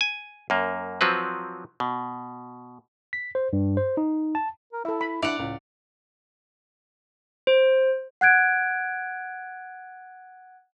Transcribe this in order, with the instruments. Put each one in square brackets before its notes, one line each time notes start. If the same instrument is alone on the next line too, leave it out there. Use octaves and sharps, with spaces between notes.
[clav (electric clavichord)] G#5
F#2 A#3
F3 F#3 C4 B4
B2
[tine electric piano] B6
C5
G2
C5
D#4
A5
[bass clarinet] A#4
[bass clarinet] E4 [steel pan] A4 E5
[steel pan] B5
[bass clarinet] D4 [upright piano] E4 F7 [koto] D5 F#5
[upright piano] C#2 [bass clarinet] A2
[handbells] C5
[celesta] F#5 F#6 G#6 D7